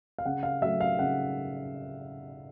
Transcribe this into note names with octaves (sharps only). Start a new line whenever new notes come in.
F5
C#3 F#5
F5
F#3 A3 E5
F5
C#3 F#5